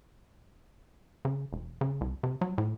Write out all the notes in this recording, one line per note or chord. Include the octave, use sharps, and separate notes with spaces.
C#3
E1
C#3
C2
C3
F#3
A2